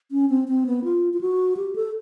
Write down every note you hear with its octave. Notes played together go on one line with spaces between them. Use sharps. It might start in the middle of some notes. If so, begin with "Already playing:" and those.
C#4
C4
C4
B3
F4
F4
F#4
G4
A4